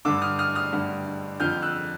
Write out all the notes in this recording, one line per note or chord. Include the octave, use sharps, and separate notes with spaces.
G2 D3 D6 E6
D#6 F6
D#6 F6
D#6 F6
G2 D3
F2 D3 F6 G6
E6 F#6